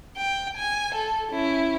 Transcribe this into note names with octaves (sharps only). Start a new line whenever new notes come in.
G5
G#5
A4
C#4 E4